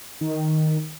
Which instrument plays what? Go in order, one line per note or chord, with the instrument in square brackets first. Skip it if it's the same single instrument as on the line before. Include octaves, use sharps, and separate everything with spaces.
[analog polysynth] D#3